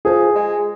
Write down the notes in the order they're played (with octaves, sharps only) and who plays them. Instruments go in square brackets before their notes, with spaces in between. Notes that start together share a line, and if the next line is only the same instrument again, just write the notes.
[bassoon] F3 [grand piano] G#4
[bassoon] G#3